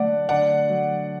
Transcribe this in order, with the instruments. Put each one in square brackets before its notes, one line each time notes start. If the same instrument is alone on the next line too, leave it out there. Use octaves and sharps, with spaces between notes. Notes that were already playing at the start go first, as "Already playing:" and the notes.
Already playing: [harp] D3 F#3 A3 D4 [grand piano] D5 F#5
[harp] D3 [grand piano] D5 F#5
[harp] F#3